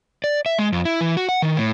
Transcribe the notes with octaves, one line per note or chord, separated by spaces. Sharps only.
D5
E5
G#3
F2
E4
E3
F#4
F#5
D#3
A2